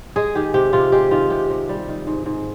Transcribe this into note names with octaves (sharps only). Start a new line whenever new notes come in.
G#3 G#4
D#3 G4
C3 G4
C3 F4
G#3 G4
D#3 F4
C3 G4
C3
G3
D#3
G#2
G#2